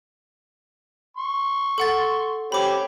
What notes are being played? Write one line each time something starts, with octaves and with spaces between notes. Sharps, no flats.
C6 C#6
A4 F#5 A6
C#4 G4 C5 B5 D6